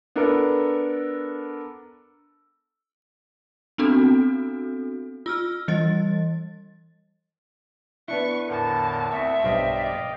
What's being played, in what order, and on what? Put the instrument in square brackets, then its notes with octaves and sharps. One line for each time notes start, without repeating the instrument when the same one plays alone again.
[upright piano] B3 D4 A4 A#4
[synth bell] B3 C4 D4 F#4 A4
F4 E6 F6
E3 G3 D#5 A6
[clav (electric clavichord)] B3 D4 E4 [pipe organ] B4 [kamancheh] C#6
[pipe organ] E2 A2 D3 [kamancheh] A#4 A5
[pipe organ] D2 C4 C#6 [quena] E5
[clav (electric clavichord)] B1 G2 C5 [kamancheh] D5 [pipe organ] D#5 F5 G5